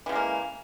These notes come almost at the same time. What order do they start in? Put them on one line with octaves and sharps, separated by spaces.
E3 C#3 G#3 A#3